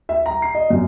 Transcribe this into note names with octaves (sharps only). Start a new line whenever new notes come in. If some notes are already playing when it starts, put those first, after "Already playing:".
E5
A#5
C7
D#5
F#2